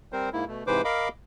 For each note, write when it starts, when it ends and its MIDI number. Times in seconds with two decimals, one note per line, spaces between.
0.13 0.29 55
0.13 0.29 60
0.13 0.29 70
0.13 0.29 72
0.33 0.45 44
0.33 0.45 58
0.33 0.45 64
0.48 0.64 47
0.48 0.64 57
0.67 0.82 44
0.67 0.82 48
0.67 0.82 52
0.67 0.82 71
0.67 0.82 72
0.67 0.82 86
0.85 1.08 70
0.85 1.08 75
0.85 1.08 77
0.85 1.08 83
0.85 1.08 86